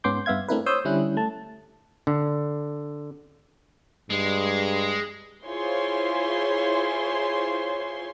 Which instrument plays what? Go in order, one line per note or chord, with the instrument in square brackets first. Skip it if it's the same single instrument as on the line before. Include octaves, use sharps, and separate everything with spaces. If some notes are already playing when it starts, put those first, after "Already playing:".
[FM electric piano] G#2 B3 C#4 C6 D6 G6
G2 B3 E5 F5 G#6
A3 C4 D4 E4 A#4 B4
C5 C#5 C6 D#6 E6 G6
D3 G3 C#4 E4 F#6
A3 A5
[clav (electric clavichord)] D3
[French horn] G2 [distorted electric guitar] G#3
[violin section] E4 F4 G#4 C5 C#5 C6